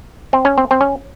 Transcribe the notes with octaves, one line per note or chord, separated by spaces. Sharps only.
C4
C#4
C4
C4
C#4